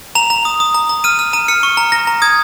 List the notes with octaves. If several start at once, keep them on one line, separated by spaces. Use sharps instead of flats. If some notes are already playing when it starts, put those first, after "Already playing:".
A#5 F7
A#5
D#6
D#6
A#5
A#5
F6 D#7
F6
A#5 D#7
F6 C#7
C#6
A#5
A#5 A#6
A#5
D#6 G#6